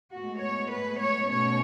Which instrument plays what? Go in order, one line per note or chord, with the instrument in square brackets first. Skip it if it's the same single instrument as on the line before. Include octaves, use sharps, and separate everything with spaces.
[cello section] A2 G#3 B3 F#4
C#5
B4
C#5
B2 A3 C#4 C#5